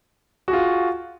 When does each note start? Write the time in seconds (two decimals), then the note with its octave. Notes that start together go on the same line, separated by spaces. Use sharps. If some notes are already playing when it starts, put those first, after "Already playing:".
0.48 F#4
0.51 G#4
0.53 F4